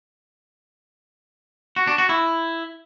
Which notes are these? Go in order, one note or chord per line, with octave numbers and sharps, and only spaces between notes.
F#4
D4
F#4
E4